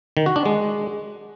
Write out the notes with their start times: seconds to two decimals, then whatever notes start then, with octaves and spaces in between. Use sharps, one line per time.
0.17 D#3
0.26 F#4
0.36 D4
0.45 G#3